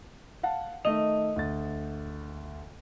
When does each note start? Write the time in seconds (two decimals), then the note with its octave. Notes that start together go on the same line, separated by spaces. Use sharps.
0.43 F5 F#5 A5
0.85 D#3 A3 D#5 F7
1.36 D2 A6